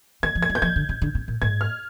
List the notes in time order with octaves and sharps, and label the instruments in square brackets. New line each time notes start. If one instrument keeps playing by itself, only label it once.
[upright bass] D#3 [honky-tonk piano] G#6
[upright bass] F3
[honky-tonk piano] G#6
[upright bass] G3
[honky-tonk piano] G6
[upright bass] F3 [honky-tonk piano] G#6
[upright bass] D3
C3
D3
C3
A#2
[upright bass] G#2 [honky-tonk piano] G#6
[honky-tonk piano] F6